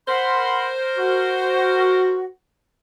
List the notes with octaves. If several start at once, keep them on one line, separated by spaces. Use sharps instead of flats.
A#4 C5 F#5 B5 C6
F#4